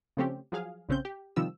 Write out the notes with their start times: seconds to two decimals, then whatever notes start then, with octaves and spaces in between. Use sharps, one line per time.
0.17 C#3 F3 A3 C4 C#4 G4
0.52 F3 F#3 G#4 F5
0.89 A#1 C#3 C4 C#4 G6
1.05 G4
1.36 C3 D#3 F3 G3 E6